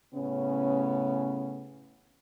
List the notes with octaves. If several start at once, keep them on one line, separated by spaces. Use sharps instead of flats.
A2 C#3 B3 C#4